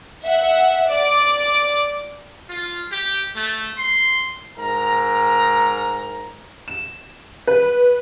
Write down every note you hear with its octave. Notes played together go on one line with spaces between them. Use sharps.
E5 F#5
D5 D6
F4
G4
A3
C6
G#2 A#4 A#5
E7
B4